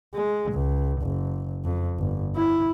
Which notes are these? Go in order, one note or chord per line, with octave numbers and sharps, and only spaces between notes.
G#3
C#2
F#1
F2
G1
E4